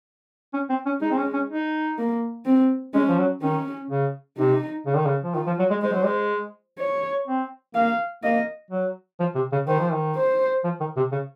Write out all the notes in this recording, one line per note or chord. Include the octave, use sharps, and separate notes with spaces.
C#4
C4
C#4
G#3 D#4
C4
C#4
C#4
D#4
A#3
C4
G#3 C#4
F3
F#3
D#3 C#4
C#3
C3 D#4
C#3
D#3
C#3
F3
D#3 F4
F3
F#3
G#3
G#3 C5
F#3
G#3
C#5
C4
A#3 F5
A#3 D#5
F#3
F3
C3
C#3
D#3 C5
F3
D#3
C5
F3
D#3
C3
C#3